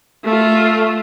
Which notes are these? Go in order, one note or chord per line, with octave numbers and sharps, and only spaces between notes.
A3 F4